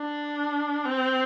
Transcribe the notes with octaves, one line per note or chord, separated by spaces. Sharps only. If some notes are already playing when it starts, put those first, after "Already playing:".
Already playing: D4
C4